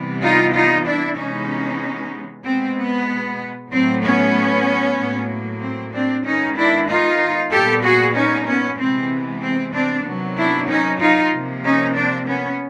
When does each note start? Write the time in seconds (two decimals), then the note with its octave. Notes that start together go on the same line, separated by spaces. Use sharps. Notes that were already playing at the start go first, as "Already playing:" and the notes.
Already playing: C3 E3 G3 B3
0.23 D#4 F4
0.54 D#4 F4
0.87 D4 E4
1.18 C3 E3 G#3 B3 C#4 D#4
2.45 B2 G#3 B3 C4
2.76 B3
3.71 A2 F#3 A3 C4
4.03 B3 C#4
4.98 A2 F#3 A#3
5.61 C4
5.93 C4 D4
6.25 D#3 G#3 B3 C#4 D#4
6.56 D4 E4
6.88 D#4 F4
7.51 A#2 G3 B3 G4 A4
7.83 F#4 G#4
8.15 C#4 D#4
8.47 B3 C#4
8.78 C3 E3 G#3 B3 C4
9.42 C4
9.73 C4 D4
10.05 C3 D#3 F#3 B3
10.37 D4 E4
10.68 C#4 D#4
11.00 D#4 F4
11.32 C3 F3 A#3
11.64 C#4 D#4
11.95 C4 D4
12.27 B3 C#4